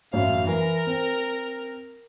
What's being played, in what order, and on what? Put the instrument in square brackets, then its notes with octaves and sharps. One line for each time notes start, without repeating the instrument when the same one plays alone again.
[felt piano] A1 F#2 E5 [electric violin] F5
[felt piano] E3 [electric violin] A#4
[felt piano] C4